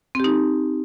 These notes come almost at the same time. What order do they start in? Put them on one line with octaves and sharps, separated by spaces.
C4 G4 D#4